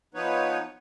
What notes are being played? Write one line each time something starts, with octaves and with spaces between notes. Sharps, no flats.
F3 B3 D#4 B4 C#5